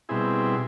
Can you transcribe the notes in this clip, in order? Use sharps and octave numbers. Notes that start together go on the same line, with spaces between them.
B2 G3 C4 E4 G#4